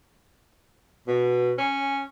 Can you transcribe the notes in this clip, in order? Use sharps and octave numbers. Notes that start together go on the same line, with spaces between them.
B2
C#4